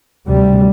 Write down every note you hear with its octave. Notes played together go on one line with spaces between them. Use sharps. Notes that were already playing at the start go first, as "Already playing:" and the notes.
D2 C3 G3